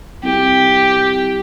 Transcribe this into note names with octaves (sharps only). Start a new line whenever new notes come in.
C2 G4